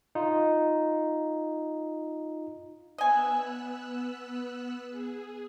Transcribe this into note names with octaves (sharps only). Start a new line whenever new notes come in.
D#4 F4
B3 D#5 G#5 E6 F#6
G#4